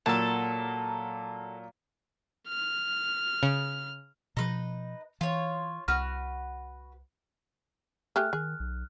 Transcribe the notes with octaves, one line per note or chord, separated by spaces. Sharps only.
A#2 F#3 A#3 A4 A5
F6
C#3
B2 F3 D#4 B4
E3 F4 C#5
C2 F#4 B4 F6
A3 G4 G#4 F6 F#6
D#3 G#4
B1